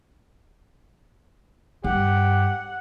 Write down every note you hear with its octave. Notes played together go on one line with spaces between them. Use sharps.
G2 G4 F#5